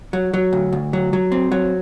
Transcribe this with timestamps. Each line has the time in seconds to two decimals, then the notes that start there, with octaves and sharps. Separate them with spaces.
0.13 F#3
0.34 F#3
0.53 D2
0.73 D2
0.93 F#3
1.13 F#3
1.32 C4
1.52 F#3